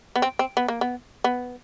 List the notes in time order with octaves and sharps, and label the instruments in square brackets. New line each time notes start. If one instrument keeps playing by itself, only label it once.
[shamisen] B3
C4
C4
B3
A#3
B3
B3